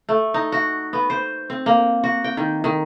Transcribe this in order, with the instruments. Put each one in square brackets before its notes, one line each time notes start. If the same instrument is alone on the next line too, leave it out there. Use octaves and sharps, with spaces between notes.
[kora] A3
D#4
F#4
B3
C5
C4
A#3
F#4
G5
D#3
D#3